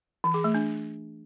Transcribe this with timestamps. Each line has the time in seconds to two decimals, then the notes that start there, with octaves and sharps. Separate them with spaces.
0.24 E3
0.34 G#4
0.44 A3
0.54 D4